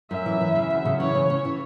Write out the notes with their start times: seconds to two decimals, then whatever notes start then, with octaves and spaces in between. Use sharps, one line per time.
0.10 F#2 E5
0.26 E3
0.41 E3
0.55 C#3
0.70 F#2
0.85 C#3
1.00 E3 C#5
1.15 C#4
1.30 C#4
1.45 E3